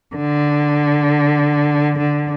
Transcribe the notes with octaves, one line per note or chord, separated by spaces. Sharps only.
D3
D3